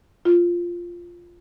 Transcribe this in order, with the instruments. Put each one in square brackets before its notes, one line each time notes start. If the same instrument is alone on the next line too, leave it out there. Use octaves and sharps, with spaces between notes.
[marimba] F4